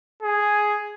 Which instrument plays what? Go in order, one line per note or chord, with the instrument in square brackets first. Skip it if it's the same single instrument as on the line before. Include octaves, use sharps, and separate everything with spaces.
[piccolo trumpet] G#4